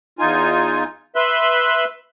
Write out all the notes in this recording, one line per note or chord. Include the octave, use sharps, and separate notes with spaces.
E2 D#4 F4 G#5
B4 E5 C6 F#6